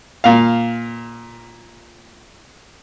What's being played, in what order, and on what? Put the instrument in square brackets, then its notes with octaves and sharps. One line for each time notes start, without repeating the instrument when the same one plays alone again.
[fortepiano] A#2 F5